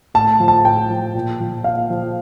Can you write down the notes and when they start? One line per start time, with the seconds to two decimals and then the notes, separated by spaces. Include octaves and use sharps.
0.14 A2 A5
0.40 F3
0.48 A5
0.64 A2 G5
0.90 F3
1.15 A#2
1.40 F3
1.64 A#2 F5
1.90 F3